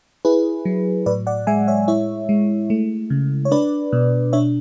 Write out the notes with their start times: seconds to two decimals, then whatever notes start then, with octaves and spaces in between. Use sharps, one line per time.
0.25 E4 G#4 B4
0.65 F#3
1.06 A2 B4 D5
1.27 D5 F#5
1.47 G#3 E5 G#5
1.68 C#5 E5
1.88 E4 C#5 E5
2.29 G#3
2.70 A3
3.10 C#3
3.45 C#5
3.51 D4 B4 D5
3.93 B2
4.33 D4 C#5 E5